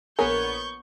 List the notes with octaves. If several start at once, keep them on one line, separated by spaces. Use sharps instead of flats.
A#1 B3 G#4 A#4 C#5 C#6 G6